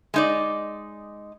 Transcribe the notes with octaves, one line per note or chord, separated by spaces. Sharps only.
G#3 D#4 D5